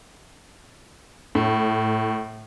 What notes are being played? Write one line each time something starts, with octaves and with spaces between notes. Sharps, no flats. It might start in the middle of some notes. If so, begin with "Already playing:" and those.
A2